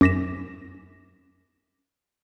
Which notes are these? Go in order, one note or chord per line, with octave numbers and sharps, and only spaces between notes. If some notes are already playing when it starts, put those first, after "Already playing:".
F#2 D6 A#6 B6 E7